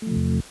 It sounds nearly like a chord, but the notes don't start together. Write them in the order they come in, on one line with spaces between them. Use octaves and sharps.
A3 F3 C3 E2